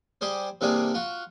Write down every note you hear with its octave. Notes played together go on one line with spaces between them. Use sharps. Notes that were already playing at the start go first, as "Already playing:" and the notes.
G3 G4 G#4 C5
C3 E3 G3 A#3 D4 G#4
F4 F#4